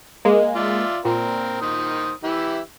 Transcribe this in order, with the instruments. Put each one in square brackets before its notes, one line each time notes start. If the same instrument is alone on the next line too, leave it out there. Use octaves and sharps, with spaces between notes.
[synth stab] G#3 A#3
[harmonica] F4 D5 E5
[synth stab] A#2 [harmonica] C4 A#4
[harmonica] D#3 C5 D#6
E3 E4 G4